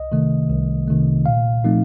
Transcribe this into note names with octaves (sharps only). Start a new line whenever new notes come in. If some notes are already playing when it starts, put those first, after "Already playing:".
Already playing: C2 D#5
C3 D#3 A3
C2
C3 D#3 A3
A#2 F5
F3 A3 C4 D#4